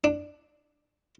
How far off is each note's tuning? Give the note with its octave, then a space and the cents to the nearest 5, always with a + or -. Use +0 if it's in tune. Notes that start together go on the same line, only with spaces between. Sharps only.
D4 +10